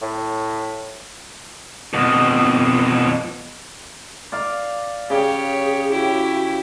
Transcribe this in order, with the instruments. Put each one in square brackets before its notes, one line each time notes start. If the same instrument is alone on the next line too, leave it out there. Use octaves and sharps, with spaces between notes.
[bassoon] A2
[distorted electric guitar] F2 B2
[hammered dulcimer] D5 F5
[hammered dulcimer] C#3 [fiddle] G4 C#5 [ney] G#4
[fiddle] E4 G4 [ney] F#4